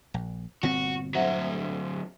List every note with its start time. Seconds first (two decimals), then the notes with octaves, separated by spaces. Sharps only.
0.14 A#1
0.63 G1 A#2 C4 F#4
1.15 D2 F#3 C5 E5 F#5